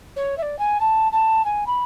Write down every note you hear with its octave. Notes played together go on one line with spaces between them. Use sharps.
C#5
E5
D5
G#5
A5
A5
G#5
B5